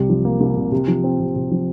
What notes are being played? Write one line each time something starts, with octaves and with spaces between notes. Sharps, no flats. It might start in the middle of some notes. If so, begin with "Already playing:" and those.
Already playing: C2 C3 G3
F3
A#3
C2
C3
C3
F3
C4
C3
C3
F3